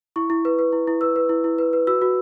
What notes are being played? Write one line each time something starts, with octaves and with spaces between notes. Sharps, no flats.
E4 C#6
E4
B4
B4
E4
E4
B4 E6
B4
E4
E4
B4
B4
F#4 E6
F#4